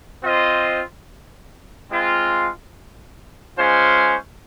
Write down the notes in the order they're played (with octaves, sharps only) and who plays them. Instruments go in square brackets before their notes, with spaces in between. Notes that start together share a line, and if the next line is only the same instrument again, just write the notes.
[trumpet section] C4 F4 C5 D#5
G#3 C4 F4
G#3 C#4 F4 C5